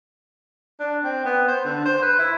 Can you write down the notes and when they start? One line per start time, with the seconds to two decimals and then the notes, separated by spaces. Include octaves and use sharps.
0.80 D4
1.04 C4
1.25 B3
1.48 C5
1.65 D3
1.86 C5
2.02 B4
2.19 E4